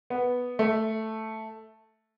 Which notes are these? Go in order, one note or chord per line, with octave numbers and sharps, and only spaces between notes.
B3
A3